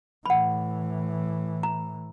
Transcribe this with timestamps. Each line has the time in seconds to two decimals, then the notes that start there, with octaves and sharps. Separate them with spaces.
0.26 A2 E3 F#5 B5
1.63 A#5